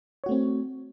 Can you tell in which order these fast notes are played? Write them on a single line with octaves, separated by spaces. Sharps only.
C#5 F#4 A3 C4